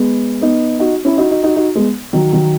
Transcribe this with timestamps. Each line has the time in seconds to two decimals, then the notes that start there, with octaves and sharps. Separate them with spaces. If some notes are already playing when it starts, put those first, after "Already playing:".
Already playing: G#3 B3
0.41 B3 D#4
0.79 D#4 F#4
1.05 C#4 E4
1.17 D#4 F#4
1.31 D#4 F#4
1.43 D#4 F#4
1.56 D#4 F#4
1.75 G#3 B3
2.13 D#3 F#3
2.33 D#3 F#3